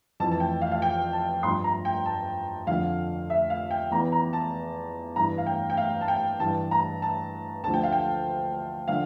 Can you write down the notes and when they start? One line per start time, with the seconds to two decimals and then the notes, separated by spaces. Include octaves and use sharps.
0.20 F2 E3 A5
0.31 A5
0.40 G5
0.61 F5
0.72 F5
0.82 G5
1.13 A5
1.43 G2 F3 C6
1.64 A#5
1.85 G5
2.06 A5
2.67 F2 D3 F3 F5
3.30 E5
3.50 F5
3.71 G5
3.91 E2 E3 A#5
4.12 A#5
4.33 A5
5.16 G2 E3 A#5
5.38 F5
5.46 G5
5.70 G5
5.77 F5
6.01 A5
6.08 G5
6.40 G2 E3 A5
6.71 A#5
7.02 A5
7.63 D2 D3 F3 A5
7.74 G5
7.83 F5
7.92 G5
8.88 D3 F3 F5